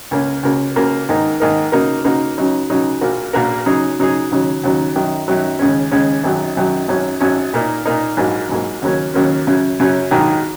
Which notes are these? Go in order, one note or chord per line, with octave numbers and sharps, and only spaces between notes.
C#2 C#3 A#3 C#4
C#2 C#3 A#3 F#4 A#4
C#2 C#3 A#3 F#4 A#4
G#2 D#3 A#3 D#4 A#4
G#2 D#3 A#3 D#4 A#4
C#3 A#3 D#4 F#4 A#4
C#3 A#3 D#4 F#4 A#4
C#2 C#3 F#3 D#4
C#2 C#3 F#3 D#4
A#1 A#2 A#3 F#4 A#4
A#1 A#2 A#3 F#4 A#4
C#3 F#3 D#4 G#4
C#3 F#3 D#4 G#4
D#2 C#3 F#3 D#4
D#2 C#3 F#3 D#4
F#2 D#3 F#3
F#2 D#3 F#3
D#2 C#3 G#3 C#4
D#2 C#3 G#3 C#4
G#1 F#2 D#3 F#3
G#1 F#2 D#3 F#3
G#1 F#2 F#3 C#4
G#1 F#2 F#3 C#4
A#2 A#3 D#4
A#2 A#3 D#4
A#1 G#2 F#3 A#3
A#1 G#2 F#3 A#3
D#2 C#3 F#3 A#3 C#4
D#2 C#3 F#3 A#3 C#4
F#2 C#3 F#3 C#4
F#2 C#3 F#3 C#4
A#1 G#2 D#3 F#3 D#4